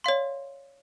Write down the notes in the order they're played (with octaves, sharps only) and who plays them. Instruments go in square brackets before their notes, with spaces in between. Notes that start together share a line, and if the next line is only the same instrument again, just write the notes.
[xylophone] C#5 D5 F5 C6